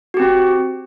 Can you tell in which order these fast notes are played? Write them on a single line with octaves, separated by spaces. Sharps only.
F#4 G4 C4